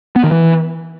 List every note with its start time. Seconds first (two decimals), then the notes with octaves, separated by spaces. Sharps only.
0.16 B3
0.24 D#3
0.31 E3